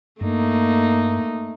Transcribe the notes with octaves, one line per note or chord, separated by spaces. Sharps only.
G2 A3 A#3 D#4